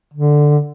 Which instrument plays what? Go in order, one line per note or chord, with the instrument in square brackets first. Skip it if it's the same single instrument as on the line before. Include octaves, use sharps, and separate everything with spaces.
[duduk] D3